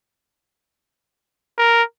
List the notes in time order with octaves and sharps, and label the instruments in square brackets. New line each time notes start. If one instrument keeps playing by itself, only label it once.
[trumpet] A#4